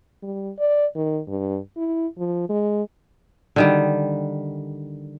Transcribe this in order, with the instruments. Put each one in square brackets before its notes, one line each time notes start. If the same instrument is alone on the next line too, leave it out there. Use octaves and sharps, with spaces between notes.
[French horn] G3
D5
D#3
G2
E4
F3
G#3
[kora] D3 D#3 G3